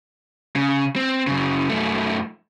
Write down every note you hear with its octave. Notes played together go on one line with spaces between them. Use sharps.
C#3
C4
F#2 C#3
F#2 A3